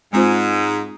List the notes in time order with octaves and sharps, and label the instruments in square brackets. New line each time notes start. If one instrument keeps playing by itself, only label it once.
[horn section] G#2 [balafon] G#3 C4 F4 C5